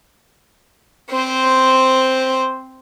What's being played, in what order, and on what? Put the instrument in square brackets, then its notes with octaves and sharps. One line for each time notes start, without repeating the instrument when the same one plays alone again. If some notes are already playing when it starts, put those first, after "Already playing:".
[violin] C4 C5